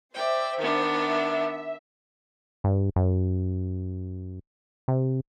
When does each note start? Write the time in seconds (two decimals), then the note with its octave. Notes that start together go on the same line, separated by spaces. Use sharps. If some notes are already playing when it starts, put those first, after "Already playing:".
0.15 C5 D5 E5 G5
0.59 D#3 B3 D4
0.95 E5
2.64 G2
2.96 F#2
4.88 C3